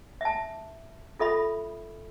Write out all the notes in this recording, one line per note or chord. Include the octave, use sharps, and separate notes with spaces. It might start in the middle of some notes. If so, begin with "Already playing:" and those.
E5 A5
F4 A4 E5 B5